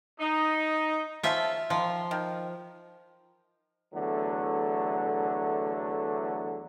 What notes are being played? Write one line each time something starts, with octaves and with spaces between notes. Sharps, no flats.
D#4
F3 C#4 F4 A4 E5
D#3 F3 F4
D#3
E2 D3 F#3 A3